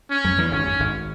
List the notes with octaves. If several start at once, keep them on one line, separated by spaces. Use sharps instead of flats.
C#4
F#2 F#3
E2 E3
G#1 G#2 C#4
F#2
G#1 G#2